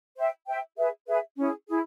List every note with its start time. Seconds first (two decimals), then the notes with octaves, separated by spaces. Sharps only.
0.17 C5 E5 G5
0.47 C5 E5 G5
0.77 G#4 B4 E5
1.07 G#4 B4 E5
1.37 C#4 E4 G#4
1.68 E4 G#4